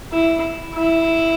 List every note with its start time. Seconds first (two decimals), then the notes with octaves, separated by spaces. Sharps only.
0.12 E4
0.74 E4